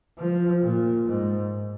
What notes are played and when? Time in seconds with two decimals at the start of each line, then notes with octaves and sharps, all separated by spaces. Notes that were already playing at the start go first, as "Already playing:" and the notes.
0.18 F3
0.62 A#2
1.06 G#2